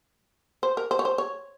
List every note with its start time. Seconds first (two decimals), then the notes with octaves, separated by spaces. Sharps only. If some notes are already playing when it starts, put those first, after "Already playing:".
0.63 C5
0.77 A#4
0.91 C5
0.99 C#5
1.05 C5
1.18 C#5